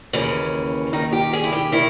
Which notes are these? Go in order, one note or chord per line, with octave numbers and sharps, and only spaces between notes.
D#2 C#3 E3 C#4
D#2 D#3 D#4
G4
G#4
E4
G4
D#3 E4